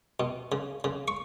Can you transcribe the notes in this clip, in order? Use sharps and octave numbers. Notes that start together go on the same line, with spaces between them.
B2
C#3
C#3
C#6